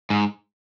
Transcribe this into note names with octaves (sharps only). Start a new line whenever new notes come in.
G#2